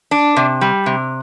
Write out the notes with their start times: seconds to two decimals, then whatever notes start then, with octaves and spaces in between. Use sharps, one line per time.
0.11 D4
0.37 C3
0.61 G3
0.86 C3